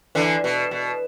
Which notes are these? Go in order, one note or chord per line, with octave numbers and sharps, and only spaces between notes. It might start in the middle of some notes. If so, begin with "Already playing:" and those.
D3 E3
B2
B2